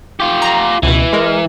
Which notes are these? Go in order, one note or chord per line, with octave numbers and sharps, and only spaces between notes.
F4 G4
A#5
C#2 B2 E3
G#3 A#4